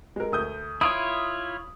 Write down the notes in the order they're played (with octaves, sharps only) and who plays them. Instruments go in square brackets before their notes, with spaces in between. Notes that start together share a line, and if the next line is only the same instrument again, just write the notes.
[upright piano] G#3 A#4
D2 D#6 G6
[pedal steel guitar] E4 F4 C#5 [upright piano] D#6 D7